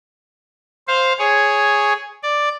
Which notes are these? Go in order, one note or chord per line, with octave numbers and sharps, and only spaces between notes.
C5 F5
G#4 C#5
D5